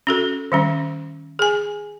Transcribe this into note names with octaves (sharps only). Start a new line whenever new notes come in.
C#4 F#4 A4
D#3 G3 C#4
G#4 G#5